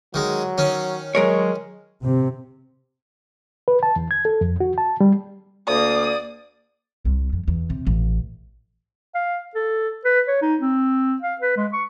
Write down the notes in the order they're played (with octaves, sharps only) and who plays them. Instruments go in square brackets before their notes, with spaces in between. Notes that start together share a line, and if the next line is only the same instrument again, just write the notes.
[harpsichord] D#3 G#3 [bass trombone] F#3
[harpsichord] D#3 C#4
[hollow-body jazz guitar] F#3 A#4 C#5 [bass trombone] G#3
[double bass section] C3
[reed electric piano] B4
A5
E2
G#6
A4
F2
F#4
A5
G3
[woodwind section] D2 A#3 [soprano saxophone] D5 [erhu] D#6
[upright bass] C2
F2
E2
C3
A1
[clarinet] F5
A4
B4
C#5
D#4
C4
F5
B4
G#3
C#6